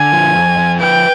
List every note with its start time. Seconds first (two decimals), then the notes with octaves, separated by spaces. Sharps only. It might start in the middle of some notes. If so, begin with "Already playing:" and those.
Already playing: D3 G#5
0.12 F3
0.35 F2
0.58 F3
0.80 B4 G5